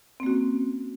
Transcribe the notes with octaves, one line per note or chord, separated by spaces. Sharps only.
A#3 C4 C#4 F#4